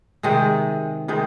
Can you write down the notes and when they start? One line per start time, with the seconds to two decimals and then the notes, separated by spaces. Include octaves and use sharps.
0.23 C3 D#3 G#3
1.08 C3 D#3 G#3